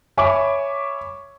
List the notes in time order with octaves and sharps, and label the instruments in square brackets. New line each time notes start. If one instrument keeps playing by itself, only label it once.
[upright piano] C#5 E5 G#5 B5 C#6 D6